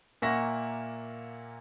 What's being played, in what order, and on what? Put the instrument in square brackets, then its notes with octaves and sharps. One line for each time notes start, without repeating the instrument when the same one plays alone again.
[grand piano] A#2 A#3 E5 F#5 C#6 A#6